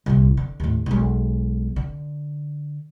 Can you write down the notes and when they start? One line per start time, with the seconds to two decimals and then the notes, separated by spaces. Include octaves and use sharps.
0.06 C2 A#2
0.37 D3
0.60 D#2 A2
0.86 B1 G#3
1.76 D3